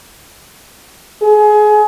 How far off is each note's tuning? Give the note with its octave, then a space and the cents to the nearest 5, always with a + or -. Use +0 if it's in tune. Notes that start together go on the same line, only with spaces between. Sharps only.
G#4 +25